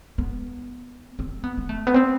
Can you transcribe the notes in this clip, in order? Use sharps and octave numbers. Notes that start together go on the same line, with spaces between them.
B3
C4
B3
B3
A3
B3
C4